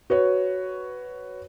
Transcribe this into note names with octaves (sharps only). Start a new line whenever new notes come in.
F#4 B4 C#5